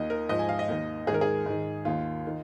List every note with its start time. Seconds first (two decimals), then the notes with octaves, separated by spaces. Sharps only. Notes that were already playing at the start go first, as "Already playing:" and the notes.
Already playing: D#2 D#3 D#5
0.10 A#4
0.29 G#2 F3 D#5
0.39 G#5
0.49 F5
0.59 D#5
0.68 D#2 D#3
1.07 G#2 D#3 G#4
1.14 A#4
1.21 G#4
1.46 G#2 D#3
1.85 D#2 D#3 F4
2.27 D#3